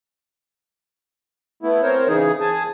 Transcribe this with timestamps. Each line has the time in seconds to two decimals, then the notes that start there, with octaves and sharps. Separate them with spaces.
1.63 A3 B3 E4
1.83 C4 A#4 C5 C#5
2.08 C#3 E3 D#4 G#4
2.41 G#4 G#5 A5